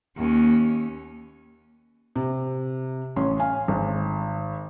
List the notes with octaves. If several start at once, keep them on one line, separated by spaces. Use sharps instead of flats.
D#2 C#4
C3
A1 C#4 C6
F5 G#5
G#1